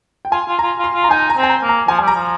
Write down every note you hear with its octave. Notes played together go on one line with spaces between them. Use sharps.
G5
F4 G#5
F4
F4 A#5
F4
C6
F4
A#5
D#4 G#5
A#5
C4
G#5
A#5
A#3
A#5
F3 G#5
G3 G#5
A#5
F3